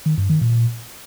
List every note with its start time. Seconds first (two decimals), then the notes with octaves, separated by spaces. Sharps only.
0.06 D#3
0.18 G2
0.30 D#3
0.41 A#2